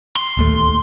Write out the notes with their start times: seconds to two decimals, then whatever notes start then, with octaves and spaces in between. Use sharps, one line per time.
0.17 C6
0.37 D1 D#2 A3